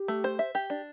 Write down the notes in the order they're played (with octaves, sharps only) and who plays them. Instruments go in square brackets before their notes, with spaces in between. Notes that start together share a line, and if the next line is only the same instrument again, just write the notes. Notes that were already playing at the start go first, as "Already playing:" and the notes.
Already playing: [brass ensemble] G4
[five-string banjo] A3
C5
E5
G4
D4